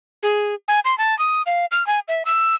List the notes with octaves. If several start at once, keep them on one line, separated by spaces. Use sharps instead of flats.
G#4
G#5
C6
A5
D#6
F5
F6
G#5
E5
E6